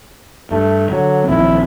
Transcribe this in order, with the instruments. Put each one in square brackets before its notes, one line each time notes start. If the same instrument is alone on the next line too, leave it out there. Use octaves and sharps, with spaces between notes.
[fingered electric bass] G2 [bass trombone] A3
[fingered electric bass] D3 [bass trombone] F#3
[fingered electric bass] A#1 D#2 C4 [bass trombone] E4